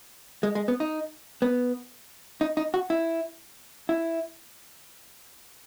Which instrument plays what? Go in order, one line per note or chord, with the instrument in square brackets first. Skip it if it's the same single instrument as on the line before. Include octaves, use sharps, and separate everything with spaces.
[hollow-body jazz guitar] G#3
G#3
B3
D#4
B3
D#4
D#4
F#4
E4
E4